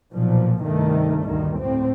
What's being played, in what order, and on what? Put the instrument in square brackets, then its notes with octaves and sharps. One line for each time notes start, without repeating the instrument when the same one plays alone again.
[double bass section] B1 A#2 F3
C2 G2 D#3 A3
D2 G2 A#2 D#3
A2 C4